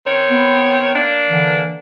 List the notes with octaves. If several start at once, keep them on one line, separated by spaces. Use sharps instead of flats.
D#3 C4 C#5
B3
A#3 D4
D3 E3